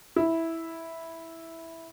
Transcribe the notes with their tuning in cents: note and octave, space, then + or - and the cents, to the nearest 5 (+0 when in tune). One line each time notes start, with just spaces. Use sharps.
E4 -5